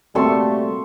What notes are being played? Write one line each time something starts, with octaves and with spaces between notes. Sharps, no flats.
G3 A3 A#3 C4 F#4 A4 C6 C#6